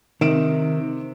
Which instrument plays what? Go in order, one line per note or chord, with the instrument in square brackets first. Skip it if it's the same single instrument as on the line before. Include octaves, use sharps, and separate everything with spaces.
[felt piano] C3 D7 E7 [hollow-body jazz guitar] D#3